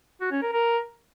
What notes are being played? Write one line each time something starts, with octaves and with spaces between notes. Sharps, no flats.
F#4
C#4
A#4
A#4